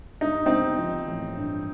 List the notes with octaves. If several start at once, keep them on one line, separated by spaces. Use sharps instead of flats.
G2 D#4
D3 C4 D#4
F3
A1
G2